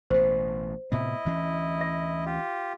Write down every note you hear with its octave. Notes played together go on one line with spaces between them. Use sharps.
A1 B2 C5
A2 C3 B3 E4 D#5
D2 E3 C#4
E5
F4 G4